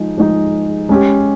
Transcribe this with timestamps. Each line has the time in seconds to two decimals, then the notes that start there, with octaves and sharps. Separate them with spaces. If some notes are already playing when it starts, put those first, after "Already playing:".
Already playing: F3 G#3 D#4
0.17 F3 G#3 D#4
0.89 G#3 C#4 G4